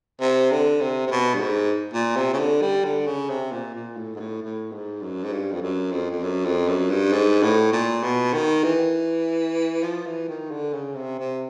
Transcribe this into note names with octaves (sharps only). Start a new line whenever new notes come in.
C3
D3
C3
C3
B2
G2
G#2
A#2
C3
C#3
D3
G3
D3
C#3
C3
A#2
A#2
A2
G#2
A2
A2
G#2
F#2
G#2
G2
F2
F#2
F2
F2
F#2
F2
F#2
G2
G#2
A2
A#2
B2
D#3
E3
F3
E3
D#3
D3
C#3
C3
C3